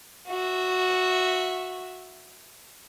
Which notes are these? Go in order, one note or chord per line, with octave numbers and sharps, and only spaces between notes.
F#4 E5